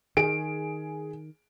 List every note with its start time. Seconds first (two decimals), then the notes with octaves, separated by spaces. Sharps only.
0.17 D#3 G#4 D7